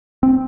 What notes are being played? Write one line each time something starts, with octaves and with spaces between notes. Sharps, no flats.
C4